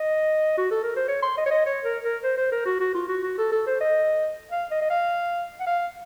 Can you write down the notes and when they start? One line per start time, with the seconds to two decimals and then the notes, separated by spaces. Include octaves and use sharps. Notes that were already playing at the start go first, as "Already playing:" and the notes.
Already playing: D#5
0.58 F#4
0.71 A4
0.84 A#4
0.96 C5
1.08 C#5
1.22 C6
1.37 D#5
1.46 C#5
1.51 D#5
1.66 C#5
1.85 A#4
2.04 A#4
2.23 C5
2.37 C5
2.52 A#4
2.66 F#4
2.80 F#4
2.95 F4
3.08 F#4
3.23 F#4
3.38 A4
3.52 A4
3.67 C5
3.81 D#5
4.51 F5
4.71 D#5
4.81 D#5
4.90 F5
5.60 F#5
5.67 F5